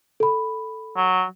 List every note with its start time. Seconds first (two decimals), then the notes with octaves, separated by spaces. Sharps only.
0.20 A4 B5
0.97 F#3